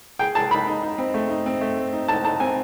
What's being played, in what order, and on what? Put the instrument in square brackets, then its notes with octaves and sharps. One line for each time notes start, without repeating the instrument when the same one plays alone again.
[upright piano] G#4 [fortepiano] G5
[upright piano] G#4 [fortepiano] A5
[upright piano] D#4 [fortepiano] B5
[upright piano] D#4
D#4
C4
A3
D#4
C4
A3
C4
D#4
[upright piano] D#4 [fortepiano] A5
[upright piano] D#4 [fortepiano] A5
[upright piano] C4 [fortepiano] G#5